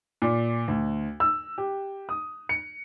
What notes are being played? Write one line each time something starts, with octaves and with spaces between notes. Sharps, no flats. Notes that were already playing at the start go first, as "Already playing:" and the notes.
A#2
D2
E6
G4
D#6
C#7